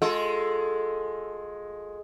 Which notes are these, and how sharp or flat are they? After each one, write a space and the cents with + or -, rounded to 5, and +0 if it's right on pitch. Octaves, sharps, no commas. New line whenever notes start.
G#3 +5 F4 +40 A4 +0